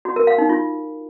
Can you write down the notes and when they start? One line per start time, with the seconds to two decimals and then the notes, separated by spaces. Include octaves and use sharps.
0.05 F#4
0.16 A#4
0.27 F5
0.38 D#4
0.49 F4